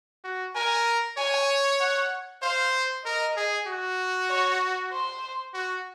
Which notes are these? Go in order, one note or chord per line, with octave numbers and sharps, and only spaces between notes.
F#4
A#4 G#5
C#5 G#5
F#5
C5 F5
A#4 D#5
G#4
F#4
C#5
C5
F#4